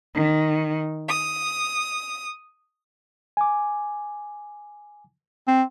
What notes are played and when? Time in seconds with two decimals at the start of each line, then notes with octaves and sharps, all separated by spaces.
0.14 D#3
1.08 D#6
3.37 G#5 D6
5.47 C4